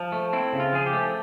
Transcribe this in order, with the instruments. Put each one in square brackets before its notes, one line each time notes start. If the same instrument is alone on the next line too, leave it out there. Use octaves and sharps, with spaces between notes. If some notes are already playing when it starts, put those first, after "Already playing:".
Already playing: [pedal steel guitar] F3
A3
C4 E4
C#3
F4
F3 G#4
G4
A3